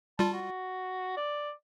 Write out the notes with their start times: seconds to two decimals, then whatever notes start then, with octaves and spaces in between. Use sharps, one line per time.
0.19 G3 F4 A5
0.33 F#4
1.17 D5